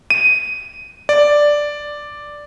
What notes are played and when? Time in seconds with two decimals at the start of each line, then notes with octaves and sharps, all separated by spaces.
0.10 D#7
1.09 D5